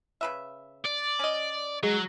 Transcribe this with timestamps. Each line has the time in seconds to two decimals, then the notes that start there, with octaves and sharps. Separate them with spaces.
0.21 C#3 B4 E5
0.85 D5
1.19 C#4 D#5
1.83 F#3 G#3